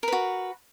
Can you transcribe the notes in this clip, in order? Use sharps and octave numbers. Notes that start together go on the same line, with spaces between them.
F#4 A#4 B4